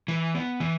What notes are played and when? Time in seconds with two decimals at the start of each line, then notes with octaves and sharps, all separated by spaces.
0.08 E3
0.35 B3
0.60 E3